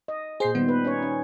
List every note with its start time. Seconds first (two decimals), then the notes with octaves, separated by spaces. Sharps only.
0.08 D#5
0.40 A#2 G#4 C5 C7
0.55 D#3 G3 B3
0.68 B4
0.84 C#4 D#4 C#5
1.03 C#4